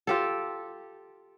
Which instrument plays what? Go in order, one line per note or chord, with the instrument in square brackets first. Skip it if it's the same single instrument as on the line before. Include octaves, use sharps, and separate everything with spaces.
[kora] F4 G4 A4